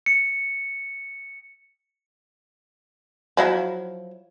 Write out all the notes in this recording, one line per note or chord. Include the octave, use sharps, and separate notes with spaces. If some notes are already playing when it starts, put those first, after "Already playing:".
C#7
F3 F#3 E4